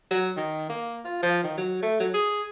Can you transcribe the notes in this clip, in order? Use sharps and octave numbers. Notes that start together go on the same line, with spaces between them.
F#3
D#3
A#3
F4
F3
D#3
F#3
A3
F#3
G#4